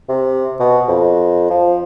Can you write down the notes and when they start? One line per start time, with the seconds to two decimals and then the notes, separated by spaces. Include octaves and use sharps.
0.09 C3
0.60 B2
0.88 F2
1.50 F3